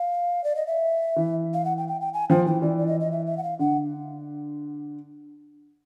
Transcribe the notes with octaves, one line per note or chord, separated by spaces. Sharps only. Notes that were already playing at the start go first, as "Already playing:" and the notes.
Already playing: F5
D5
D#5
E5
E3
F5
F#5
G5
G5
G5
G#5
F3 G5
E3 G5
E3 D5
D5
D#5
D#5
E5
E5
F#5
F5
D3 F#5